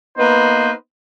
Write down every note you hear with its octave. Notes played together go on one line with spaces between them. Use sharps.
A#3 B3 D#4 B4 C5